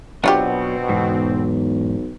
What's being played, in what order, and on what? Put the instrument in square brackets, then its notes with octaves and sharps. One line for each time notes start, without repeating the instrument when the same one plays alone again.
[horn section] B2 C4 [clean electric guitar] F#3 B3 [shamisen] D4 F4 G4
[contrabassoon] B1 [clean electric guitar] E2 G#2